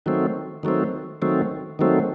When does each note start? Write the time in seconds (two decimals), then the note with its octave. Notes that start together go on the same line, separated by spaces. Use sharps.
0.06 D#3 F#3 A3 C4
0.63 D#3 F#3 A3 C4
1.22 D#3 F#3 A3 C4
1.79 D#3 F#3 A3 C4